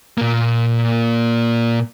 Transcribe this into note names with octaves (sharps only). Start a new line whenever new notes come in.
A#2 A#3